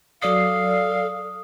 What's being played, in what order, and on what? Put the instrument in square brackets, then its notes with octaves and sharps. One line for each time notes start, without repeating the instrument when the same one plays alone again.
[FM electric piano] F#3 D5 C7 [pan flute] A4 [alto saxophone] F5 [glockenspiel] D#6